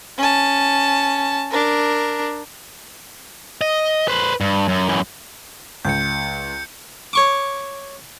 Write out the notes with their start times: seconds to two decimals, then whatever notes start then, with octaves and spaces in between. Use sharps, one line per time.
0.18 C#4 A5
1.50 D4 A#4
3.61 D#5
4.08 B4 C5
4.41 G2
4.68 F#2
4.89 F#2 E3
5.85 C#2 G6 C#7
7.13 C#5 C#6 D6